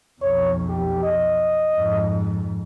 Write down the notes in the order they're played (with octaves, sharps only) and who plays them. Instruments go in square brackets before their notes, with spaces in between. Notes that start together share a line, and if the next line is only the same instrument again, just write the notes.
[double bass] B1 F2 [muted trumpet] C#5
[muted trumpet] G4
D#5
[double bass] F2 G#2